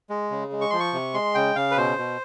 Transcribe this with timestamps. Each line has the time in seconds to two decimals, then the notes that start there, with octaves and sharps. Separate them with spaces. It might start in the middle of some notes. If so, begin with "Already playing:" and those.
0.10 G#3
0.31 C#3
0.52 G#3
0.61 C#6
0.70 F3 C6
0.80 C#6
0.93 C3
1.14 G#3 C6
1.35 C#3 G5
1.56 C#3 F5
1.71 B4
1.77 B2 C5
1.98 B2